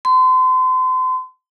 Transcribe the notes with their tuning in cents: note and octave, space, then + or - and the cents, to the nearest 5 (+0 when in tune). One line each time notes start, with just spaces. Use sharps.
C6 -35